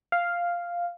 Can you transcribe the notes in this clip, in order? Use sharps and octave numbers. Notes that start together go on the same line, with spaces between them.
F5